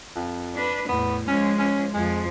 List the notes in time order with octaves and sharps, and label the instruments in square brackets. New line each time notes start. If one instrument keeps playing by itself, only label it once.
[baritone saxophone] F2
[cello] D4 B4
[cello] E2 A2 [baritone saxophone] B3
[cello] F3 G#3 [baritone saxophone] C#4
[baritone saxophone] C#4
[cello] F2 F3 [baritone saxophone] G#3